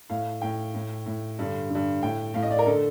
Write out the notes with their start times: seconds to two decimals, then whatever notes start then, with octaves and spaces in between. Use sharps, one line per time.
0.10 A2 F5
0.41 A2 G5
0.74 A2
1.06 A2
1.39 G2 D3
1.70 G2 D3
2.02 A2 G5
2.34 A2 F5
2.42 D#5
2.51 D5
2.59 A#4
2.66 D3 A4